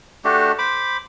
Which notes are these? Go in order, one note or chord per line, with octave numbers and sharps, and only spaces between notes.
A3 D4 F#4 G4
C5 B5 D6